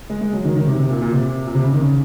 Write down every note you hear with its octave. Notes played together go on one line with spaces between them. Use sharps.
G#3
G#3
F#3
D#3
D#3
C3
C3
A#2
A#2
C3
A#2
C3
C#3
D#3
C#3